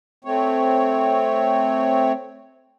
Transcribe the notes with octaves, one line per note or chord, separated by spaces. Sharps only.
A3 C4 C#5